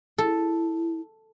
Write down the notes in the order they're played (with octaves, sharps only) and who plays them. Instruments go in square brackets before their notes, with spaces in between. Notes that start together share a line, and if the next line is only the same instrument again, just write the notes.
[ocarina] E4 [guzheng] A4